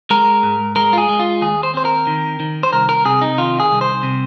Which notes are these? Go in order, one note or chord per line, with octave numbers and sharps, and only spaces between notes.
G#3 A#4
G#2
G#3 A#4
F4
G#4
G#3
F4
D#2 G#4
C5
C4 C5
A#4
D#3
D#3
C5
C2 A#4
A#4
C3 G#4
D#4
D#3 F4
G#4
C2
C5
C3